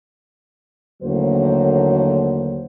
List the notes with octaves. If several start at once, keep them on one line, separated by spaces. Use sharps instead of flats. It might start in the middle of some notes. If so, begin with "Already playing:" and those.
D#2 A2 D3 F#3 A#3 C5